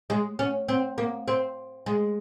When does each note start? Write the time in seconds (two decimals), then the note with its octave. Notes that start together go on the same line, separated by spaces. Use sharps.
0.10 G#3
0.39 C#4
0.68 C4
0.98 A#3
1.28 C4
1.86 G#3